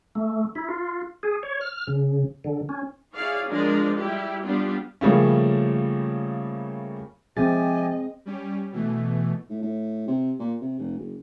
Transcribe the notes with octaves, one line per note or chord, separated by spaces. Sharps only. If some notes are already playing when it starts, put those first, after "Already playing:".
A3
E4
F4
G#4
C#5
F6
C#3
D3
C#4
E4 G#4 C#5 D5 F5
F3 G#3 D4 A#4 D5
G3 E4 G4
G3 B3 D4 F4 G4
C#3 F3 G3 A3 A#3 C#4
F3 C4 G4 G#4 D#5 E5 G#5 A6
G3 C#4 G4
B2 E3 A3
A2
A2
C3
A#2
C3
F1
F#1